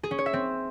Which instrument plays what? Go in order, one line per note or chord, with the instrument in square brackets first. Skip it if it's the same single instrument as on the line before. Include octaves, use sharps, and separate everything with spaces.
[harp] G#4
C#4
C#5
E5
C4